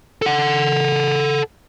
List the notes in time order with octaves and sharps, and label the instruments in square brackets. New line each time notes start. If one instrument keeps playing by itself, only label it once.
[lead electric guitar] A4 F#5